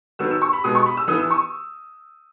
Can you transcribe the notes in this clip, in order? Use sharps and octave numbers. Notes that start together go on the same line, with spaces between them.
D#3 F#3 B3 E6
E6
C#6
B5
B2 G#3 B3 D#6
C#6
B5
E6
E3 B3 D#6
E6
C#6